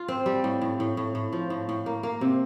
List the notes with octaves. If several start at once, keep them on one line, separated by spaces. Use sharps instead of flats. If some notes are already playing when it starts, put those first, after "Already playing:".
Already playing: F4
C4
G3
A2
A2
A2
A2
A2
F3
A2
A2
A#3
A#3
C3